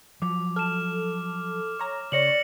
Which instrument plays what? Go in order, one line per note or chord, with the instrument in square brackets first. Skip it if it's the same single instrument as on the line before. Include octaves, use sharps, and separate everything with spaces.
[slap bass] F3 F#3 [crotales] D6
[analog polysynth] A4 [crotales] F6 E7
[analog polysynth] C#5 A#5
[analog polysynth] C#3 C#5 [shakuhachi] D5 [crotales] A#6 C#7 F#7